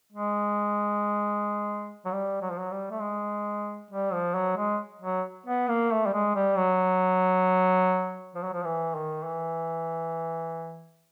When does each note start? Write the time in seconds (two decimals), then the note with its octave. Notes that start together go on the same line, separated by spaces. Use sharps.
0.12 G#3
2.05 F#3
2.12 G3
2.41 F#3
2.51 F3
2.60 F#3
2.71 G3
2.91 A3
3.01 G#3
3.91 G3
4.13 F3
4.35 F#3
4.57 G#3
5.02 F#3
5.46 B3
5.69 A#3
5.91 A3
6.06 G3
6.13 G#3
6.35 G3
6.57 F#3
8.35 F3
8.44 F#3
8.53 F3
8.65 E3
8.95 D#3
9.24 E3